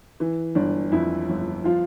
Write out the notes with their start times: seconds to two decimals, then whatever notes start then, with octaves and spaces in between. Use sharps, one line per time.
0.20 E3
0.55 G1 D4
0.92 F2 E4
1.29 G1
1.64 F3 F4